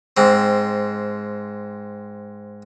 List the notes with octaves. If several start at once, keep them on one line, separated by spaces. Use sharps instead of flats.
G#2 C4